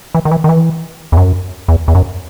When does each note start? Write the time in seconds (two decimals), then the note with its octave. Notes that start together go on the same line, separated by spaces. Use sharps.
0.15 E3
0.25 D#3
0.31 E3
0.44 D#3
0.49 E3
1.12 E2
1.17 F#2
1.68 E2
1.88 E2
1.95 F#2